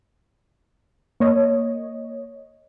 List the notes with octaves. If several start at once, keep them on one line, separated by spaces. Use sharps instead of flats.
A#3 C#5 D#5